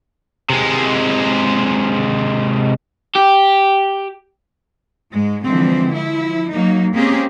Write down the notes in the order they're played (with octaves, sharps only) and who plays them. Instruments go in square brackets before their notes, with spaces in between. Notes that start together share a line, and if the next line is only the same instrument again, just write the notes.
[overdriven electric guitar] C3 G#3
G4
[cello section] G#2 G#3
D3 E3 F3 G#3 C4
F3 E4
F#3 A#3 D#4
G#3 A#3 C4 C#4 G4 G#4